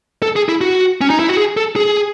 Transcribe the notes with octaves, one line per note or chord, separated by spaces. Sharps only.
A4
G#4
E4
F#4
C#4
D#4
E4
F#4
G#4
A4
G#4